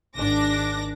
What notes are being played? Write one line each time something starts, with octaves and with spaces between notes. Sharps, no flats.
G#1 D4 D6 A#6